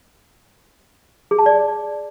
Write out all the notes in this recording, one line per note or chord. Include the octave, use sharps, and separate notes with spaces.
G#4
A5
D5